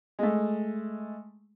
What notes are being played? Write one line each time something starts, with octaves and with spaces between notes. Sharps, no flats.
G#3 A3